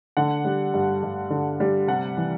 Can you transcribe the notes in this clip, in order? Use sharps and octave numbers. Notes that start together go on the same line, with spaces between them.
D3 F#5
G3
G2
G2
D3
G3
C3 F#5
E3